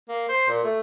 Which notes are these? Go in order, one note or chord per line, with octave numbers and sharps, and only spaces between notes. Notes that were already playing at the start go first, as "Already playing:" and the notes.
A#3
C5
A#2
A3